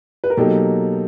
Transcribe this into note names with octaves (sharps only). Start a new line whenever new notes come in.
B4
A#4
B2 F#3 A#3 D#4 G4 A4